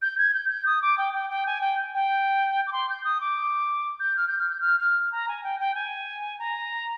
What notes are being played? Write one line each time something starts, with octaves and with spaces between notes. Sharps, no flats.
G6
G#6
G6
G6
D#6
D6
G5
G5
G5
G#5
G5
G5
D6
C6
G6
D#6
D6
G6
F6
G6
F6
G6
F6
F6
A#5
G#5
G5
G5
G#5
A#5